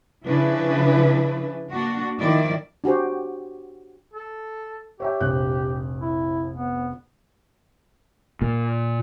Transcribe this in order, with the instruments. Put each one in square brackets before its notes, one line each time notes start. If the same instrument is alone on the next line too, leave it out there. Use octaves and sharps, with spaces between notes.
[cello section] C#3 F3 D4 E4 B4
A#3 D4 F#4
D#3 F3 E4 D5
[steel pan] D4 F#4 G4 C5
[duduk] A4
[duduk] G4 [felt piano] C#5 E5 G5
[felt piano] F1 A#1 F#6
[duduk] E4
B3
[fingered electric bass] A#2